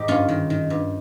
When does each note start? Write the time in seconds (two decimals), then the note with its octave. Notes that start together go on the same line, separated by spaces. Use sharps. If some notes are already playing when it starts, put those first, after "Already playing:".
Already playing: G#2 D#3 D#4 G4
0.08 G2 C#4 F4
0.28 D#3
0.50 D#3
0.70 G2